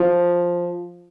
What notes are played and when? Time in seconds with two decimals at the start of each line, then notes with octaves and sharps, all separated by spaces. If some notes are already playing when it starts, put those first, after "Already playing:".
Already playing: F3